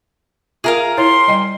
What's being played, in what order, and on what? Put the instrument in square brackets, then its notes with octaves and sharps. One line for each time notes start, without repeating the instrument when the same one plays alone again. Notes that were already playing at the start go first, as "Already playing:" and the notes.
[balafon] F4 E5 [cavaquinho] G#4 A#4 F5
[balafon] E4 C#5 [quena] C6
[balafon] G3 D#5 G5